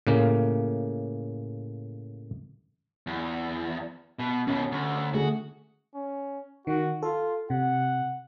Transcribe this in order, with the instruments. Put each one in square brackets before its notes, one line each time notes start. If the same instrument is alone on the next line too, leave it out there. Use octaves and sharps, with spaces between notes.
[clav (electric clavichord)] A2 C#3 A#3
[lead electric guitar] E2
B2
[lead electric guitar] D#2 B2 [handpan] C#4
[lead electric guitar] D2
[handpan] D3 A3 G#4 [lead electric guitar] F#4
[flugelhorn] C#4
[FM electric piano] D#3 [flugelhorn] F#4
[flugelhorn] F4 [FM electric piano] A4
[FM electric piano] C3 [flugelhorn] F#5